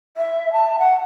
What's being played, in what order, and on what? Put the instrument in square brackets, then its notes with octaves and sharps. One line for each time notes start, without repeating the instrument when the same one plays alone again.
[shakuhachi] E5
A5
F#5